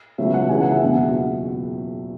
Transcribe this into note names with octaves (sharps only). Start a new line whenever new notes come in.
C#2 B2 F#3 E5
F#5
C#2 C#3 E3 G#3 G#5
F#5
E5
F#1 E2 B2